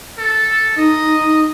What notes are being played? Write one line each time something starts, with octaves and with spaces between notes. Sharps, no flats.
A4
D#4 D#5